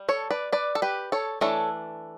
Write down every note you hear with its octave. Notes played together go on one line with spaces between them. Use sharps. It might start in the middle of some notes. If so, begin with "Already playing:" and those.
Already playing: G3
A4 C#5
B4 D5
B4 D5
A4
G4 B4
A4 C#5
E3 A3 D4 A4 C#5